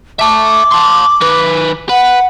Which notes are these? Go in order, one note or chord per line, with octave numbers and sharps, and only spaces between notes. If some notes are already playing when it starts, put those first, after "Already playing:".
E5 A5 D6
A5 C6
D#3 B4
B4 F#5